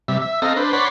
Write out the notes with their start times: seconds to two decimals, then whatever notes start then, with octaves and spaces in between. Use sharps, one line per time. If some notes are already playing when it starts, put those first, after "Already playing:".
0.08 C3 G3 E5
0.22 E5
0.42 C4 A4 D#5 F5 A#5
0.57 D4 B4 C5
0.73 C#5 D5 F#5 B5 C6